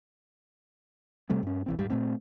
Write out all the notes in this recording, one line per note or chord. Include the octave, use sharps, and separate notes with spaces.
C3 G3 A3 C4
G2 C#4
B1 E3 C4
D#1 G#2 G3
A#2 A3 C4